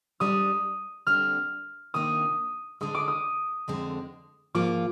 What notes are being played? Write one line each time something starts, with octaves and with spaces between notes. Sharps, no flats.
G#2 G3 D4 D#6
D3 G3 C4 F6
C3 D#3 A#3 D4 F4 D#6
D2 D3 G#3 D#6
D6
D#6
F2 D3 G#3 C4
G#2 F3 A#3 F4 D6